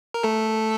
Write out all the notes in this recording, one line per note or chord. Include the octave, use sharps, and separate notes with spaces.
A#4
A3 A4